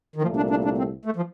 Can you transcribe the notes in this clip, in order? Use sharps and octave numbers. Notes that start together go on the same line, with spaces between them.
D#3
C2 A#2 F3 A3
D4
D4
D4
C4
A3
F3